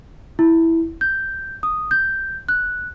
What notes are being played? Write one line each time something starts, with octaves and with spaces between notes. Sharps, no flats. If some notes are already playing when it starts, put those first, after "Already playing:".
E4
G6
D#6
G6
F#6